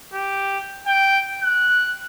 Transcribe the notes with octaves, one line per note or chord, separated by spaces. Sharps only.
G4
G5
F#6